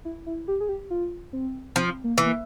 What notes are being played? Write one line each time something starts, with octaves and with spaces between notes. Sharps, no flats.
E4
E4
G4
G#4
G4
F4
C4
F3 C4
A#3
E3
A#3